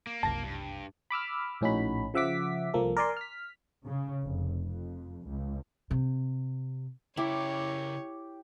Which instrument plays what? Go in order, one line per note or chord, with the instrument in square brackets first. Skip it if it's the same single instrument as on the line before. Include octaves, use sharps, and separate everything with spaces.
[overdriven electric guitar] A#3
[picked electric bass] F#1 C2 [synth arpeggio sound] A5 A#6
[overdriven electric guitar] G2
[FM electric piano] B5 D6 E6 F6
A#1 A2 C#4 D#4 F#4 B5
C#3 F3 E5 F#5 D6 B6
C2 F3 A#3 A4
A#4 D5 G#5 C6
F6 B6
[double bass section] C#3
F1
F2
C#2
[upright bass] C3
[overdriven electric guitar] C#3 A#4 [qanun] E4 [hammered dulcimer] G4 D6 [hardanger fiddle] C#5